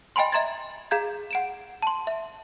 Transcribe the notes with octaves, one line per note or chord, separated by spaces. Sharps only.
D#5 G5 G#5 B5 C6
D#5 E5 A#5 C6 G#6 A6
G#4 F5 A#5 G6 G#6
F#5 D7 E7
A5 C6
E5